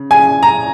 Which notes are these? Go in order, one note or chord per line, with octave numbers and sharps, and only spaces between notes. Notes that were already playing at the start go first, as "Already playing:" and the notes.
Already playing: C#3
G#5
A#5